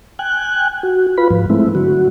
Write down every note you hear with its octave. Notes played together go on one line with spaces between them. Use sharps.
G5 G#5 F#6
F#4
F4 B4 B5
G#2 F3
G#3 A3 C4 E4
D3 F#3 F#4